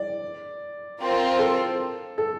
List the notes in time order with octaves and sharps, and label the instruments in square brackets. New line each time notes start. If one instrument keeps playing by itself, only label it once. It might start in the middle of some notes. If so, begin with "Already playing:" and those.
Already playing: [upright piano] D5
[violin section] C4 F4 A#4
[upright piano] A4
A4